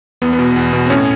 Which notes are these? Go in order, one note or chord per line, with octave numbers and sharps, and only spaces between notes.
E2 B3
B3
B2
E2
B2
C4
A2 C#4